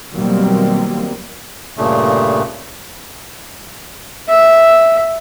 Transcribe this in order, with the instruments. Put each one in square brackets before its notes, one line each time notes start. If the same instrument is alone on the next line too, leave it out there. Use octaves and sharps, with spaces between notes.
[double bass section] B2 D#3 F#3 G3 A#3 C4
[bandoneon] G2 A#2 C#3 A3
[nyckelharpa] E5